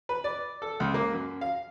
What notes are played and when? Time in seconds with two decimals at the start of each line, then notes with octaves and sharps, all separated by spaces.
0.09 B4
0.24 D5
0.62 A4
0.80 C#2
0.94 A#3
1.13 F#2
1.41 F5